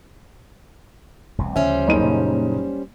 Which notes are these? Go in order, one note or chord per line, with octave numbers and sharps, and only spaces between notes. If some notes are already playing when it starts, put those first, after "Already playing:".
E1 C2 C3
D2 C#3 F3 G3 C#4 C5 E5
F#1 D#4 D#7
A#2 C#3 F#3